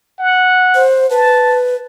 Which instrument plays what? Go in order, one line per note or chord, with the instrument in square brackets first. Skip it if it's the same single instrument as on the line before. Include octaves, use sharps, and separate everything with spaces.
[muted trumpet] F#5
[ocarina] C5
[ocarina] B4 [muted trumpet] A5